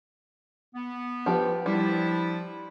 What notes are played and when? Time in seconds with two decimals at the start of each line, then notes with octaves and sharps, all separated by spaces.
0.74 B3
1.26 F3 G4 B4
1.66 F3 G3 D4 E4